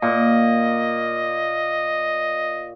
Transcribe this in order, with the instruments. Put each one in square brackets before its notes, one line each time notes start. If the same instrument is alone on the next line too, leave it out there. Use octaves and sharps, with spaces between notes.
[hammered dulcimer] A#2 [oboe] D#5